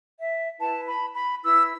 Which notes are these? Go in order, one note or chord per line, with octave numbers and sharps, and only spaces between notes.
E5
E4 B4 A5
B5
B5
E4 B4 E6